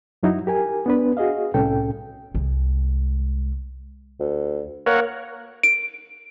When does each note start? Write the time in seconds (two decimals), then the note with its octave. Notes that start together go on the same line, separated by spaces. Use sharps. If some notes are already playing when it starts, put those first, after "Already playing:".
0.23 F#2 F#3 D#4 E4 F#4
0.47 G4 A#4 G#5
0.86 B3 D4 B4
1.17 F#4 G#4 D#5 F5
1.54 C2 A2 C#4 A4 G5
2.35 C2 G#3
4.20 D2
4.86 A#3 A#4 C#5 F#5
5.63 D7